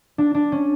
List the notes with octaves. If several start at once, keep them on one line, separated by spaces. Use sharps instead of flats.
D4
D4
C#4